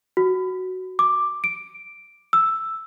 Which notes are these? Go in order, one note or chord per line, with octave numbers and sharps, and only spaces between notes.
F#4
D6
D7
E6